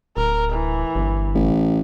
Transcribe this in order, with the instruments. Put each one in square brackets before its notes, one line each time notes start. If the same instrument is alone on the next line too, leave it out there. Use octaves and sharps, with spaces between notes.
[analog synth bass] D1 [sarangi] A#4
[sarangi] E3
[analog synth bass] G1
[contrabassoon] A1